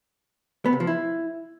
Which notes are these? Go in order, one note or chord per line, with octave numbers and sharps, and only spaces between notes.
B3
C3
F3
E4